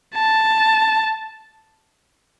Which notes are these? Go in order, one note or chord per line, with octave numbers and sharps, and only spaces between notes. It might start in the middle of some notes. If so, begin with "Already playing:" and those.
A5